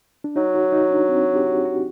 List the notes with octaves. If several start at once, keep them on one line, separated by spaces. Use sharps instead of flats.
D4
F#3 D#4
F#4
D#4
D4
C4
G4
F#4
F#4